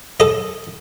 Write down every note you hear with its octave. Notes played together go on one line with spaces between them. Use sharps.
A4 D#5